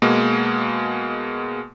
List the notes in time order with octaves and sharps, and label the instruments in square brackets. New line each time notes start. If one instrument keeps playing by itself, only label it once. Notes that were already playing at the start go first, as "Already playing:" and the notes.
[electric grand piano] B2 G#3 A#3